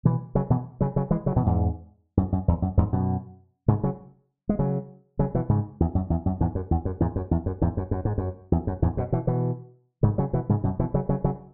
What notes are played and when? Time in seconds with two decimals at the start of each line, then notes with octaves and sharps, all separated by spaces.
0.05 B2 E3
0.35 C#3 F#3
0.50 B2 E3
0.81 C#3 F#3
0.96 C#3 F#3
1.11 E3 G#3
1.26 C#3 F#3
1.36 B2 E3
1.46 E2 G#2
2.17 F#2
2.32 F#2
2.48 E2
2.62 F#2
2.77 E2 G#2
2.93 F#2 B2
3.68 G#2 C#3
3.83 C#3 F#3
4.49 G#3
4.59 C#3 F#3
5.19 C#3 F#3
5.35 B2 E3
5.49 G#2 C#3
5.80 E2
5.95 F#2
6.10 E2
6.26 F#2
6.41 E2 G#2
6.55 F#2
6.71 E2
6.85 F#2
7.00 E2 G#2
7.16 F#2
7.31 E2
7.46 F#2
7.62 E2 G#2
7.77 F#2
7.91 F#2
8.05 G#2
8.18 F#2
8.52 E2
8.67 F#2
8.82 E2 G#2
8.97 F#2 B2
9.12 B2 E3
9.27 B2 E3
10.03 G#2 C#3
10.18 C#3 F#3
10.33 B2 E3
10.49 G#2 C#3
10.64 F#2 B2
10.79 B2 E3
10.94 C#3 F#3
11.09 C#3 F#3
11.24 C#3 F#3